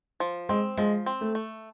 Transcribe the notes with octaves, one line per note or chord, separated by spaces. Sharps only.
F3
G#3 C4
F3 G#3
C4
A3
A3